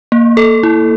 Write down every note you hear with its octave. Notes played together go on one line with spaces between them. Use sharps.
A#3
A4
E4